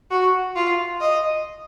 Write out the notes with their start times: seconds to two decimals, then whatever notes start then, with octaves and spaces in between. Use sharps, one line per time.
0.11 F#4
0.56 F4
1.00 D#5